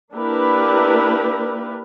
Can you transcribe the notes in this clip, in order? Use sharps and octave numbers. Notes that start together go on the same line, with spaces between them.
A#3 D4 E4 G4 A#4 B4